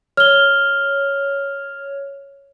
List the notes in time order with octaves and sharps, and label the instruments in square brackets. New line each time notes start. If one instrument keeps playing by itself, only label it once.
[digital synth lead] C#5 [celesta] F6 G7